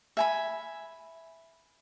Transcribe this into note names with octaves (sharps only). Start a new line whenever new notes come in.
E5 G#5 B5